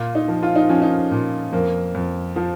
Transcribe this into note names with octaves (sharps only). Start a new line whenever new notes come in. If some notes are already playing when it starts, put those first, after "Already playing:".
Already playing: A#2 F4
D#4
F3
F4
D#4
F3 C#4
D#4
A#2
F2 A#3
F2
F3